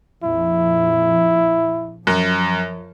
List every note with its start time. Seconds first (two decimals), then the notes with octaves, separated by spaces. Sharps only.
0.24 A#1 F2 F3 E4
2.07 F#2 F3